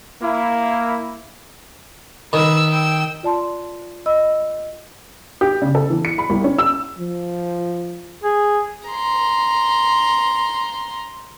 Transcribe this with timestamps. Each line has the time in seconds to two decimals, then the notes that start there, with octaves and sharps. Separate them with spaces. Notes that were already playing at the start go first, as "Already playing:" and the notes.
0.21 A#3 E4
2.33 D#3 B4 E6
2.70 G5 E6
3.23 F4 D5 A5 C6
4.06 D#5 B5 E6
5.41 G4
5.62 C#3
5.75 A4
5.90 E3
6.05 C#7
6.18 B5
6.30 C2
6.44 C#4
6.58 E6
6.98 F3
8.24 G#4
8.88 A#5 C6